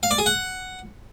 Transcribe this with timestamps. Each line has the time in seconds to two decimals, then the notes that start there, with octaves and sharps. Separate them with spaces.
0.03 F5
0.11 D5
0.18 G#4
0.26 F#5